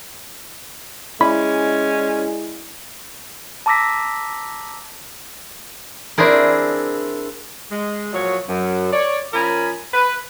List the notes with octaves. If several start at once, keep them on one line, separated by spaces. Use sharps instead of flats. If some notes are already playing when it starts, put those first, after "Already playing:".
G#3 C#4 E4 D5 B5
A5 A#5 D6 E6 A#6 B6
C4 D4 E4 G#4 A#4
G#3
A#2 F3 F#3 C#5
F#2
C#5 D5
F3 C#4 A#4 G#5 B5
B4